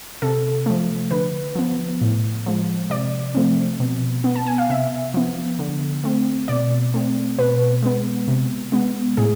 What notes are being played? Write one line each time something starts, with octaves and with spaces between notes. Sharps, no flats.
C3 A4
F3 A3
D3 B4
F3 B3
A2
F3 G#3
C3 D5
F3 A3 C4
B2
B3
A5
G#5
F5
C3 E5
F3 B3
D3
A3 C4
B2 D5
A3 C4
B2 B4
G#3 B3
C3
G#3 B3
A2 G#4